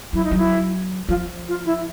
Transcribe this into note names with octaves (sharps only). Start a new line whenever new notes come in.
F#3 E4
D#4
F#3
E4
F3 F4
F4
E4